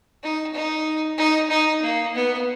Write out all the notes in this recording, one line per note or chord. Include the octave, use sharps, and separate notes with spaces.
D#4
D#4
D#4
D#4
A#3
B3